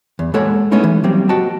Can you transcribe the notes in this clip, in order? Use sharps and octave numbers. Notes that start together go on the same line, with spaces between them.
E2
G#3 A#3 A4 C#5 F#5
G#3 A3 B3 C#4 D#4 E4
E3
F#3 G3 A#3 C4
F#4 D#5 G5 A5